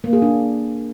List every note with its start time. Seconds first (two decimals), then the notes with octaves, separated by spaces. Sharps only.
0.04 A#3
0.13 G#4
0.22 D4